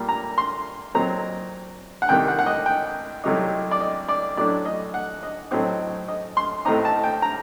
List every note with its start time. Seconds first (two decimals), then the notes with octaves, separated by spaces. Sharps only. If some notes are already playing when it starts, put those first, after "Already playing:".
Already playing: A#2 G3 A#3
0.09 A#5
0.38 C6
0.94 A#2 F#3 C4 D#4 A#5
2.02 F#5
2.09 C2 C3 D#3 G5
2.28 F#5
2.39 F#5
2.46 D#5
2.66 G5
3.24 C2 C3 F#3 A3 D#4
3.71 D5
3.81 D#5
4.08 D5
4.37 A2 F#3 A3 D4 D5
4.65 D#5
4.94 F#5
5.23 D#5
5.51 A2 F#3 C4 D#4
6.08 D#5
6.37 C6
6.65 A1 A2 A3 C4 D#4 A#5
6.85 A5
7.04 G5
7.22 A#5